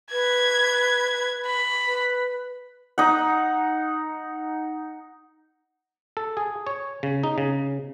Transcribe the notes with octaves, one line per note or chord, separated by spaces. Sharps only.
B4 G#6
B5
B4
D#4 F#5
A4
G#4
C#5
C#3
D#4
C#3